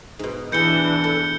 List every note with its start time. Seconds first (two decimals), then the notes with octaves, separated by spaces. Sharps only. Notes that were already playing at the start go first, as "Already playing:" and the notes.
0.19 G#2 B2
0.52 E2 E3 B3 D4 G6 C#7 G7
1.04 A4